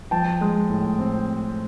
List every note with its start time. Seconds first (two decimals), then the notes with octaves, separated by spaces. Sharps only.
0.11 F3 G5 A5
0.41 G#3
0.70 A2
0.99 C4